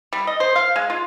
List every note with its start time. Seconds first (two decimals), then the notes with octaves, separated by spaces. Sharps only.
0.13 G3
0.27 D#5
0.40 C5
0.56 F5
0.76 G#3
0.90 F4